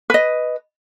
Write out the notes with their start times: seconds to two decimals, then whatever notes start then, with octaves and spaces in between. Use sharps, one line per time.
0.10 B4 D#5